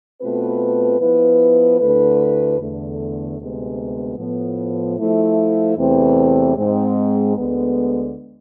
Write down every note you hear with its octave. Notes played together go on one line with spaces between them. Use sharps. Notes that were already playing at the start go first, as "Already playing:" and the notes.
B2 A3 C4 F4 B4
F3 B3 E4 B4
D2 D3 A3 E4 B4
E2 D3 A3
D2 C3 G#3 B3
A2 F3 B3
F3 A3 E4
E2 C3 E3 A3 C4
G#2 G#3 C4
D2 D3 G#3 B3